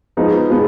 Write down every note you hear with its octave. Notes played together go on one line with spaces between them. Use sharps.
F3 G#3 B3 D#4
F3 G#3 B3